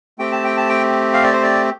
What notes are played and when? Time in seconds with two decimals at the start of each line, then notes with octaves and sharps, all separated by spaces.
0.19 A3 C4 G4 G5
0.32 A5
0.44 G5
0.57 A5
0.69 G5
1.13 F5
1.23 D5
1.33 C5
1.43 D5